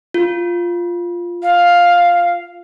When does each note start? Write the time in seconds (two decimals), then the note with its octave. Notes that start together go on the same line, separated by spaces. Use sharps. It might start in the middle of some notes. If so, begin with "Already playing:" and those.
0.14 F4
1.43 F5